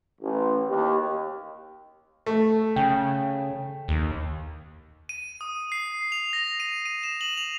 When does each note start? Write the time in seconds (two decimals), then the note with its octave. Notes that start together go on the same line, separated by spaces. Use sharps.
0.21 A1
0.68 D#2
2.26 A3
2.76 C#3 G5
3.88 D#2
5.09 D#7
5.41 D#6
5.72 C7
6.12 F7
6.33 A#6
6.60 D#7
6.85 D#7
7.03 E7
7.21 F#7
7.38 F7